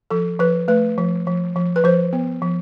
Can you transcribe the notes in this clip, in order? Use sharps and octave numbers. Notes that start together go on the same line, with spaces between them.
F3 A4
F3 B4
A3 B4
F3
F3
F3
B4
F3 C5
B3
F3